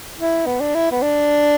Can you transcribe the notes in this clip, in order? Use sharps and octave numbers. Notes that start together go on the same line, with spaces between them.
E4
B3
D4
E4
B3
D4